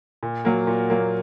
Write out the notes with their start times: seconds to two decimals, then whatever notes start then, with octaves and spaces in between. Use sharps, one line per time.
0.23 A#2
0.45 F#3 A#3
0.67 A#2
0.90 F#3 A#3